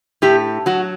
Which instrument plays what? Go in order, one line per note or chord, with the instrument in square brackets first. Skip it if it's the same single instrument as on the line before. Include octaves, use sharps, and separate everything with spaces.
[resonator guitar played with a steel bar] A2 G4
F#3 F#4